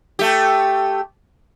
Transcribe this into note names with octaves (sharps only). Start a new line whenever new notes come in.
A3 G4